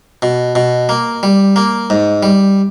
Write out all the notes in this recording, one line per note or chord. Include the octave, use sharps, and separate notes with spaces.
B2
B2
A#3
G3
A#3
G#2
G3